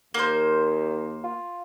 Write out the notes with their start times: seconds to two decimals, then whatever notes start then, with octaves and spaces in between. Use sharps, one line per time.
0.14 D#2 A#3 C5
1.24 F4